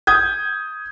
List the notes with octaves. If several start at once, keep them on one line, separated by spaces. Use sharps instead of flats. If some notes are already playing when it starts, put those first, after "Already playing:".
D#6 G6 G#6